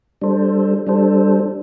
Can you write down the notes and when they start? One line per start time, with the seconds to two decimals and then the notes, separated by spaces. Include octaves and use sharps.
0.21 G3 D4 A4 C5
0.87 G3 D4 A4 C5